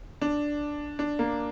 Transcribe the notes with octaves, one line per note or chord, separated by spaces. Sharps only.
D4
D4
A#3